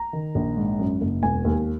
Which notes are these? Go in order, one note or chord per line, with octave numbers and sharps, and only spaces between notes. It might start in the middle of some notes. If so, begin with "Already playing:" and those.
Already playing: A#5
D#3
A#1
G#2
F#2
F#1
E1 G#5
D#2